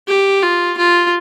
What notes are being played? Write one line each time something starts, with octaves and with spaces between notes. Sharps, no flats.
G4
F4
F4